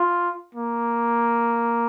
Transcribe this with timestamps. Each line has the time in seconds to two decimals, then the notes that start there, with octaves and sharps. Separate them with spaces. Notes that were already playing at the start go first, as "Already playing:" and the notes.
Already playing: F4
0.55 A#3